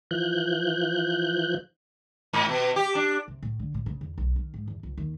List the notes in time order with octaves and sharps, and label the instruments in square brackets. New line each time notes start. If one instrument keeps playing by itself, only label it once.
[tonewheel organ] E3 F3 F#6 G6
[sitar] G#2
B2
G4
D4
[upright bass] C3
A2
D3
A2
C#3
E2
B1
D#3
G#2
E2
C#2
D#2